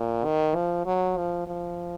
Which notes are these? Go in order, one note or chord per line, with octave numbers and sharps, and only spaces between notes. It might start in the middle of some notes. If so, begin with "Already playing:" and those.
Already playing: A#2
D#3
F3
F#3
F3
F3